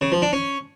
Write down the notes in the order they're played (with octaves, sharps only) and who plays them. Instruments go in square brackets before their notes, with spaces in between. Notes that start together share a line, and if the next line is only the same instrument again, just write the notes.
[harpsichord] C#3
F3
D4
C#4